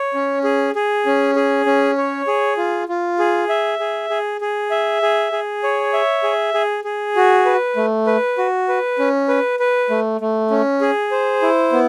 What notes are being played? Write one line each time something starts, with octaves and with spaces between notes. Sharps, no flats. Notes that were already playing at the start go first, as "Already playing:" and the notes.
Already playing: C#5
C#4
G#4
G#4
C#4
G#4
C#4
C#5
G#4
F4
F4
G#4
E5
G#4
G#4
G#4
E5
G#4
G#4
C#5
E5
G#4
G#4
G#4
F#4
B4
A3
B4
F#4
B4
C#4
B4
B4
A3
A3
C#4
G#4
C5
E4
B3